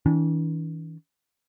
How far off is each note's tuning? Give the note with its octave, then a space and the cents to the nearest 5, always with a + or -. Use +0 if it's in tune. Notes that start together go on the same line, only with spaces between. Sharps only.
E3 -45 D4 -45